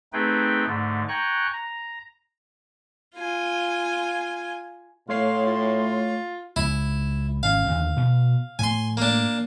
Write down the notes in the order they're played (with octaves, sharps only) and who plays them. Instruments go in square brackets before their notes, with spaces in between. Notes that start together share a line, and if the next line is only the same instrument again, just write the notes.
[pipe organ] A3 C4 D#4 G#4 B4 G5
G#2 D3 A3
G5 G#5 A#5 C#6 F#6
A#5
[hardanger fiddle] F4 G#5
[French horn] A2 [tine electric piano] A3 C#5 C7 [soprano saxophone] F5 [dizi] C6
[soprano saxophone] F4
[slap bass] C#2 [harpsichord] E4
[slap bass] G#1 C#4 [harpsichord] F5
[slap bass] D#2 D3
B2
[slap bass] A2 [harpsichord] G#5 C6
[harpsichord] A#3 D4